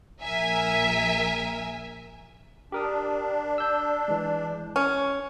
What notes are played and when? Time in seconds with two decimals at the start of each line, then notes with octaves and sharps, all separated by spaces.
0.22 A#1 A#4 E5 G#5
2.72 D4 G4 A#4 D#6
3.58 E6 G6
4.08 E3 G#3
4.76 C#4